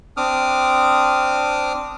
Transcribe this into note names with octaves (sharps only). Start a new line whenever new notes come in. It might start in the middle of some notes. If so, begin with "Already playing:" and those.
C4 D4 D6 D#6 F6